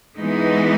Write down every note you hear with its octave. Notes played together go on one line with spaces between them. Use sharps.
E3 G#3 B3 D#4